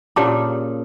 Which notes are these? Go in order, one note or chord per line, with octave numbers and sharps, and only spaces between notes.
A#2 C#3 G4 A5 D6